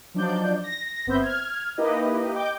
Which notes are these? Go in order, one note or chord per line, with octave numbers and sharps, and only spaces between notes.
F3 F#3 D4 D#4 D5 G6
A#6
G1 B3 C4 C5 E5 G6
F6 G#6
A#3 D#4 E4 G4 B4 D#5
D#5 G5 D6 G6